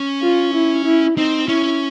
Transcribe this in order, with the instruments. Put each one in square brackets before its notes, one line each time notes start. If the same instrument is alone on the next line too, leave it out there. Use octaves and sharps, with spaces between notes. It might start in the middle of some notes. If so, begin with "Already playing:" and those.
Already playing: [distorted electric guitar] C#4
[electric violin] F4
E4
E4
[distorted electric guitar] C4 [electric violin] D#4
[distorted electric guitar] C#4 [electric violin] E4